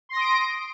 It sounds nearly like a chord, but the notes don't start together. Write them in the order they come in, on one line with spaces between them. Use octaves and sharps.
C6 A#6 D#6 D7